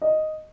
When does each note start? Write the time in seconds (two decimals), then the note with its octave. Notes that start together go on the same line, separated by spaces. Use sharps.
0.02 D#5